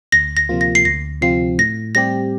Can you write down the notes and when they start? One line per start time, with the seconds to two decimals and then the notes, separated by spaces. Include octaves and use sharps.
0.12 D2 A#6
0.37 A#6
0.49 C3 F3 A#3 F4
0.61 A#6
0.75 C7
0.85 D2 A#6
1.21 C3 F3 C4 F4 C7
1.58 A2 A#6
1.95 G3 C4 G4 A#6